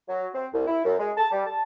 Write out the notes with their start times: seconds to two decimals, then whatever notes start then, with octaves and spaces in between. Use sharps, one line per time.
0.08 F#3
0.34 C4
0.53 C2
0.67 E4
0.85 F#2
0.99 G#3
1.17 A5
1.32 G3
1.46 A5